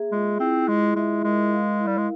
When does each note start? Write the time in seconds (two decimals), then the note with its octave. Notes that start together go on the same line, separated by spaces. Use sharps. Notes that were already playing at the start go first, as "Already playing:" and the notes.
Already playing: A#3 G#4 E5
0.12 G#3 F4
0.40 C4 E4
0.68 G#3 E4
0.96 G#3 E5
1.24 G#3 A#4
1.52 F5
1.80 E4
1.87 G3
1.98 G#3